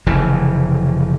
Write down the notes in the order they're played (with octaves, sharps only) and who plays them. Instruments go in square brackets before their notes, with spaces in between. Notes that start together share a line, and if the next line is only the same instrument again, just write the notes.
[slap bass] F1 C#3 E3